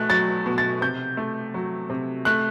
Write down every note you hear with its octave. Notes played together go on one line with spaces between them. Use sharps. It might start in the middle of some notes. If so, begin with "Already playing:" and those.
Already playing: B2 A3 F#6
F#3 A6
B2
A6
C3 G6
A3
F#3
C3
A3 F#6